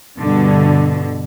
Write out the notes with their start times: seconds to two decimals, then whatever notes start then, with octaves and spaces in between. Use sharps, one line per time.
0.20 G2 B2 D3